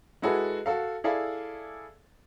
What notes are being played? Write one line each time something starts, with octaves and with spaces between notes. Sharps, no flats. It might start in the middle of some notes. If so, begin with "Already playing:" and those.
G#3 E4 F#4 G#4 A4 B4
F#4 A4 F5
E4 G#4 A4 D5 F5